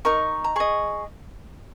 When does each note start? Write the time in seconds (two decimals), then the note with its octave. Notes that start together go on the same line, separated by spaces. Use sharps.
0.05 D#4 A#4 D#5 C#6
0.44 A#5
0.56 G#4 D#5 C#6